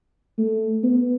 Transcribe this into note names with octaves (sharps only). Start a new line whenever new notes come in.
A3
B3